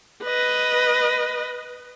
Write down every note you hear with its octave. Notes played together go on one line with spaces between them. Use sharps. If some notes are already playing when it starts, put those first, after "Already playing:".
B4 D#5